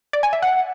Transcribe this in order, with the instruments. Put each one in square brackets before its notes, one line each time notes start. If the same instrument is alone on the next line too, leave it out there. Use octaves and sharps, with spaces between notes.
[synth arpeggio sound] D5
G#5
E5
F#5